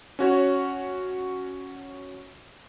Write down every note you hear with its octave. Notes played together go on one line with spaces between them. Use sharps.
C#4 F#4 C#5